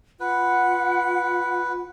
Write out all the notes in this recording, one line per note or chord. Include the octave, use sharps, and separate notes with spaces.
F4 B4 F#5